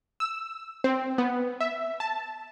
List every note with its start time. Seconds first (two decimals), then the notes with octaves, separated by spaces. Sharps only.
0.20 E6
0.84 C4
1.18 B3
1.60 E5
2.00 A5